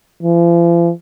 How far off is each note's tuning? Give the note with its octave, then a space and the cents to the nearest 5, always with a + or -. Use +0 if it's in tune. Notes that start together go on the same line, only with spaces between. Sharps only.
F3 -45